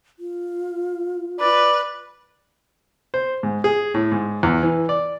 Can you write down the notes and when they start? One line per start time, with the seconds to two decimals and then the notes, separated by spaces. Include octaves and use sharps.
0.19 F4
1.40 B4 D5
3.14 C5
3.43 G#2
3.64 G#4
3.94 A2
4.12 G#2
4.43 E2
4.63 E3
4.89 D5